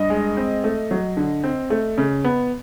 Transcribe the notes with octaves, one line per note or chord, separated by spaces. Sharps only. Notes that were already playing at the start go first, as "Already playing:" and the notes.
Already playing: G2 D#5
G#3
C4
A3
F#3
D3
C4
A3
C#3
B3